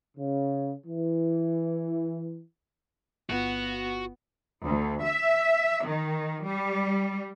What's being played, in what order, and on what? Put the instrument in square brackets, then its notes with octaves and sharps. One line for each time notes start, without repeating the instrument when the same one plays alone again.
[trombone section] C#3
E3
[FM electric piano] G1 F4 [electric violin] B3 [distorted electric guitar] F#4
[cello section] D2
E5
D#3
G3